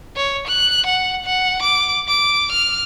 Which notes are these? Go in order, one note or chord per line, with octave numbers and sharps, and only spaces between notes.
C#5
F#6
F#5
F#5
D6
D6
F6